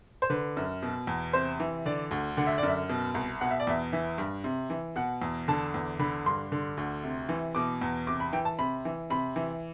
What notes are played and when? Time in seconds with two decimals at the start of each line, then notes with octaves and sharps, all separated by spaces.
0.22 C5
0.30 D3 B4
0.57 F#2
0.83 B2
1.07 E2
1.33 C3 C5
1.60 E3
1.86 D3 D5
2.11 D2
2.37 D3 F#5
2.47 E5
2.58 F#2 D5
2.68 E5
2.89 B2
3.14 C2
3.41 B2 F#5
3.51 E5
3.60 D5
3.67 E2 E5
3.93 E3 E5
4.18 G2
4.44 C3
4.70 E3
4.96 B2 F#5
5.22 E2
5.48 D3 A5
5.74 E2
5.99 D3 B5
6.26 G2 C6
6.52 D3
6.77 D2
7.03 C3
7.29 E3
7.55 B2 D6
7.82 E2
8.07 C3 D6
8.20 B5
8.33 E3 G5
8.45 A5
8.59 C3 B5
8.85 E3
9.10 C3 B5
9.36 E3